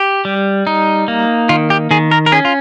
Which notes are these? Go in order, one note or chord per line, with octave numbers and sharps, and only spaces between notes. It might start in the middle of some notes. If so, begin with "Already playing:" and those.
Already playing: G4
G3
D#4
A#3
D#3 F4
G4
D#3 G#4
A#4
A#4
C#4 G#4
F4